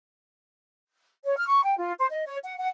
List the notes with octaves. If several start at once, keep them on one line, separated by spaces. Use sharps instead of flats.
C#5
F6
C#6
G5
F4
C5
D#5
C#5
F#5
F#5